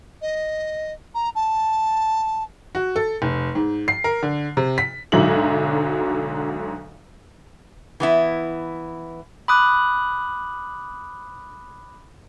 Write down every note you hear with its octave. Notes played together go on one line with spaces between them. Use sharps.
D#5
A#5
A5
F#4
A4
F1
G#2
C7
A#4
D3
C3
B6
B1 G#2 D3 F#3 E5 F#7
E3 B3 E4
B5 D6 D#6 F#6